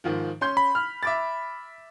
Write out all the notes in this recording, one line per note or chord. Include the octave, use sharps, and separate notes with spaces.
G#2 D#3 F3
C#4 C6 G6
B5
F6
E5 D6 A6